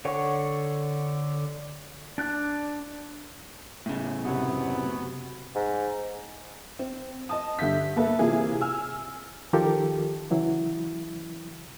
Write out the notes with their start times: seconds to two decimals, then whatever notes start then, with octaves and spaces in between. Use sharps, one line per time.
0.05 D3 C#5 F#5 C#6
2.18 D4 F#6
3.86 A2 C#3
4.25 F#2 C3 F#3 B3
5.55 G#2
6.79 C4
7.29 D#5 A5 D#6
7.59 G2 D3 E5 G6 B6
7.96 A#3 A4 B4 E5
8.19 C3 E3 A#3 E4 F4 G#4
8.61 G#5 E6 F6
9.53 D#3 F3 F4 G4 A4 A#4
10.31 C#3 E3 F#3 E4